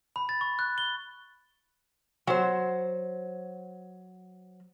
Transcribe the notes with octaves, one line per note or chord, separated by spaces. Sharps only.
B5
A6
C#6
F#6
G7
F#3 C5